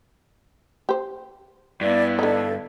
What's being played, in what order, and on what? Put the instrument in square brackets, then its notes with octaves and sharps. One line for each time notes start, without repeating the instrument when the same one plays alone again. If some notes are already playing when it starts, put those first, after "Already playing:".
[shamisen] G4 C5
[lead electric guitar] G2 [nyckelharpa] B3 E4 [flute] D5
[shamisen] D3 D#4 [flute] A4